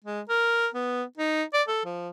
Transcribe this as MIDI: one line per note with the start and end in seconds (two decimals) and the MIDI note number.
0.05 0.21 56
0.29 0.67 70
0.74 1.04 59
1.18 1.43 63
1.54 1.63 74
1.68 1.83 69
1.85 2.09 53